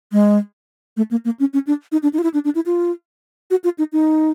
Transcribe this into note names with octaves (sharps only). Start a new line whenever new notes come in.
G#3
A3
A#3
A#3
C#4
C#4
D4
D#4
D4
D#4
F4
E4
D4
D4
E4
F4
F#4
F4
D#4
D#4